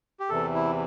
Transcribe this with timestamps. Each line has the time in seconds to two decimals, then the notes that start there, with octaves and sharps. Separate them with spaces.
0.20 G4
0.29 E2 C3 E3 A4
0.54 E4